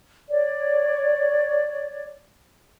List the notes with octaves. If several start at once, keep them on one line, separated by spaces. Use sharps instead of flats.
C#5 D5